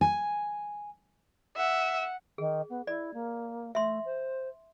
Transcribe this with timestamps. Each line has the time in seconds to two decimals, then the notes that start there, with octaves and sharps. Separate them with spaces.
0.01 G#5
1.57 E5 F#5
2.38 D#3 G#4
2.69 B3
2.87 E4 D5
3.13 A#3
3.75 A3 E5 C6
4.05 C5